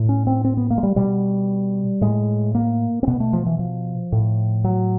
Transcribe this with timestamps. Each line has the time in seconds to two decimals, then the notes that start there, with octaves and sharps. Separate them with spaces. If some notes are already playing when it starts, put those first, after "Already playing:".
Already playing: A2
0.09 C#4
0.27 C4
0.44 C4
0.57 B3
0.70 A#3
0.78 G#3
0.83 G3
0.96 B2 G3
2.01 A2 G#3
2.55 A#3
3.03 C4
3.07 B2 B3
3.20 A3
3.33 F3
3.46 E3
3.59 F3
4.12 A2
4.64 F#3